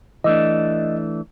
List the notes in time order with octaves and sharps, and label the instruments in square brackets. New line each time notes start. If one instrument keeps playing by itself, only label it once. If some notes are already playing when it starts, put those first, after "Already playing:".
[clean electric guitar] E3 A3 D4 [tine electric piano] D#5